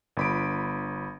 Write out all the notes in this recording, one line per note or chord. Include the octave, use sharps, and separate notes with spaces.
G1 B5 D7